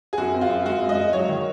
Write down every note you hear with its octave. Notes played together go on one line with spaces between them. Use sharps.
G#4
F#2 F#4
C4
F4
F#2
G#3 F#4
F#2
D#5
G#3
F#3 C#5
D#3